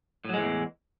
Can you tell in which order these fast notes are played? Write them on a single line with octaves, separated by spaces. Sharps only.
A2 F#3 G#3 E3 E2